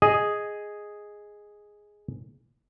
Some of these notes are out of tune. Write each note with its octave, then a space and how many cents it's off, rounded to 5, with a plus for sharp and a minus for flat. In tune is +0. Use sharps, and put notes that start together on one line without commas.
G#4 +0 D#5 +0